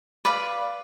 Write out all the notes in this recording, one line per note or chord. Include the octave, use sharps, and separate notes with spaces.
B4 D5 F5 B5